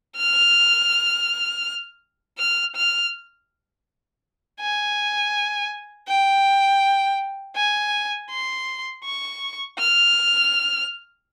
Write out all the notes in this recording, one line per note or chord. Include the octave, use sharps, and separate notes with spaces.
F6
F6
F6
G#5
G5
G#5
C6
C#6
F6